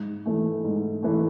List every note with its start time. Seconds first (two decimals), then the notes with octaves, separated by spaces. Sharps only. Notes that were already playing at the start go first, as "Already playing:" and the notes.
Already playing: G#2
0.26 E3 A3
0.64 G#2
1.03 E3 A3